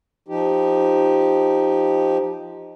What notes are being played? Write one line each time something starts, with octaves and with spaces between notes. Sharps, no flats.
F3 D#4 G4